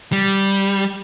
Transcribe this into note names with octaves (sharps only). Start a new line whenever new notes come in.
G3